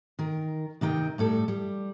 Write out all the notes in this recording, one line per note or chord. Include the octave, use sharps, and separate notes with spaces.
D#3 A#4
C3 D#3 D#4 G5
A2 G3 A4
G3